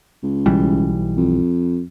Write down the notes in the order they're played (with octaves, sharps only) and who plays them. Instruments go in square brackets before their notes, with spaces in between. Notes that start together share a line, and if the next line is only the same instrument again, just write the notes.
[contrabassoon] C#2
[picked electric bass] B1 E3 G3
[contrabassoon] F2